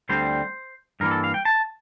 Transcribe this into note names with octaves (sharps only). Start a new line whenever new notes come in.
D2 D3 G3 C4 C5
G2 E3 A#3 A#4
A4
F5
G5
A5